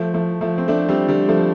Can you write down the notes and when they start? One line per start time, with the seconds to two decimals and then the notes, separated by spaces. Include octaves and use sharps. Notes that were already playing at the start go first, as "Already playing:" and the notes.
Already playing: F3 A3
0.14 F3 A3
0.41 F3 A3
0.58 C4
0.68 A3 D4
0.89 G3 C4
1.08 D3 G3
1.28 F3 A3